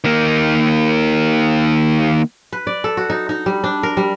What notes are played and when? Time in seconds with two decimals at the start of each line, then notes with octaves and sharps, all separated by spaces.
0.04 D#3 A#3
2.52 B4
2.67 D5
2.84 A4
2.97 F#4
3.10 D#4
3.29 D#4
3.46 G3
3.64 D4
3.83 A#4
3.97 G3